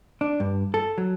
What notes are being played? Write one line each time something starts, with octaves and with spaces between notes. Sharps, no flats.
D4
G2
A4
F#3